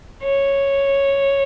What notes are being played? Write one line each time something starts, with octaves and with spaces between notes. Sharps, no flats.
C#5